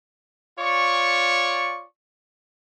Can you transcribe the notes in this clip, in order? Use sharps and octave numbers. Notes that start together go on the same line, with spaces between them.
F4 C#5 D5 C#6